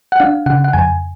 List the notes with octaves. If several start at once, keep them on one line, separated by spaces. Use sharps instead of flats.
F#5
D4 F5
C#3 F#5
F#5
F2 G#5